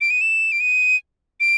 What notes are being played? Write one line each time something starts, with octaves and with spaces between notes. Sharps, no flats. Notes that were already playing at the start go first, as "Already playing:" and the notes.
D7
D#7
E7
D7
D#7
D7